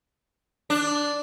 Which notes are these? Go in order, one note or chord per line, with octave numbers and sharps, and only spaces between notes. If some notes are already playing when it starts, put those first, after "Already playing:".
D4